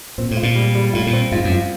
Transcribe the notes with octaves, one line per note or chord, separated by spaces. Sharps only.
A#2 C4
A2
F4
A#2
G3
G3
A2 F4
A#2
C4
G#2 F4
F#2
F4